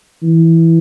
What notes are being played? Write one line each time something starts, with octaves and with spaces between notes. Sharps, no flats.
E3